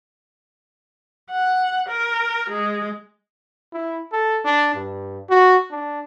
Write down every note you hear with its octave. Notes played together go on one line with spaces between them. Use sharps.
F#5
A#4
G#3
E4
A4
D4
G2
F#4
D4